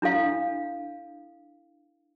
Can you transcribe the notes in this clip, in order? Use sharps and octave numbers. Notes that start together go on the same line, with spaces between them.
D4 E4 A4 F5